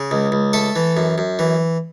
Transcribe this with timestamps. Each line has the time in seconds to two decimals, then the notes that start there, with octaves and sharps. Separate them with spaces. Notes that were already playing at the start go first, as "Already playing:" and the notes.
Already playing: C#3
0.11 C#2
0.32 C#2
0.53 A3 A4
0.76 E3
0.97 F#2
1.18 F#2
1.39 E3